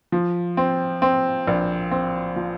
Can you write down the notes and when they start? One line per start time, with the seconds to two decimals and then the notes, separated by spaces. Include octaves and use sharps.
0.12 F3
0.57 C4
1.02 C4
1.48 A#1
1.91 C4
2.36 F3